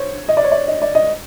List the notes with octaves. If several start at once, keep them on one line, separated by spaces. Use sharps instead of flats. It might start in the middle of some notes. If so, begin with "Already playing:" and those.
Already playing: C5 C#5
D#5
D5
C#5
D5
D#5
D5
D#5